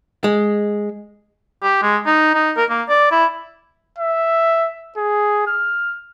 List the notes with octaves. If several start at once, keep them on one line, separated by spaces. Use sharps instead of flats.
G#3
G4
G#3
D#4
D#4
A#4
A#3
D5
E4
E5
G#4
F6